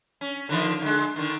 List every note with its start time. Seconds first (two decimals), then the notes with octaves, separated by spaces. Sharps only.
0.21 C#4
0.49 D3 D#3 F3
0.82 D3 G#3
1.16 D3 D#3